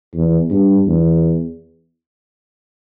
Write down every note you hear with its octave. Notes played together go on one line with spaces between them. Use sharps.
E2
G2
E2